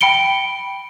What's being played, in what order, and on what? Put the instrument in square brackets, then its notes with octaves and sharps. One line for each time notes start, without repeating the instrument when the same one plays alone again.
[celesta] G5 B5 C#7 D7 G7